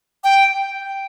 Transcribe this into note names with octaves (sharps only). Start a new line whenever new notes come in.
G5